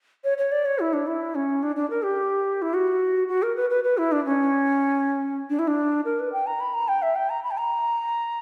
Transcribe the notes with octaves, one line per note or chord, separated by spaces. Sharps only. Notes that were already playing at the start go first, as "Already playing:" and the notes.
C#5
C#5
D5
C#5
E4
D4
E4
C#4
D4
D4
A#4
G4
E4
F#4
F#4
A#4
B4
B4
B4
E4
D4
C#4
D4
E4
D4
A#4
B4
G5
A#5
B5
A#5
G5
E5
G5
A#5
B5
G5
A#5